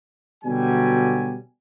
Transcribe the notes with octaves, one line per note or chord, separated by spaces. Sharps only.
B2 D3 F#3 G3 G#5